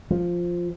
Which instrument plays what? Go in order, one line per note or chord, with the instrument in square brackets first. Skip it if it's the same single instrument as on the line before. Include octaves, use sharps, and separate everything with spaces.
[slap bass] F3